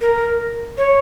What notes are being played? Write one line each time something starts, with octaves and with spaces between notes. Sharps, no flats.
A#4
C#5